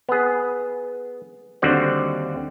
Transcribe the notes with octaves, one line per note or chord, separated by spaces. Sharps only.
B3 G#4
D#2 D3 G3 C4 F#4 F#5